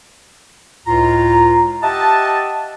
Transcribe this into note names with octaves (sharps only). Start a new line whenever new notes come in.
C#2 A2 F4 A#5
G4 D#5 E5 F#5 A5